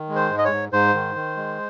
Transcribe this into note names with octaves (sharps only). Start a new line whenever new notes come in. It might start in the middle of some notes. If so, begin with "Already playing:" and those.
Already playing: D#3
G#3
C5
G#2
D#5
C#5
G#2
G#2 C5
D#3
D#3
G#3